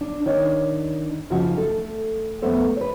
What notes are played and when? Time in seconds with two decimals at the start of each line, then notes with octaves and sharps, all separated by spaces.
0.01 D4
0.26 D#3 D4 D#4 C#5
1.30 F#2 C#3 F3 D#4 F#4
1.57 A3 A4
2.42 F2 A3 B3 A4 C5
2.77 B4 C#5